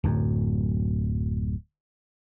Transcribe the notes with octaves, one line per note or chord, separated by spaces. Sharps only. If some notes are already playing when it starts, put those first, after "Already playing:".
D1 F#2